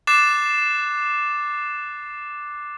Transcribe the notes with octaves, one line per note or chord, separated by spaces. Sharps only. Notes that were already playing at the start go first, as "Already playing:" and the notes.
D6 F#6 A6 C7 E7